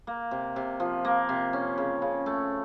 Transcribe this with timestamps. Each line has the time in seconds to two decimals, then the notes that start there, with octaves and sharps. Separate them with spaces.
0.07 A#3
0.31 C3
0.56 C3
0.80 F3
1.05 A#3
1.29 C3
1.53 C#4
1.78 C#3
2.02 C#3
2.26 A3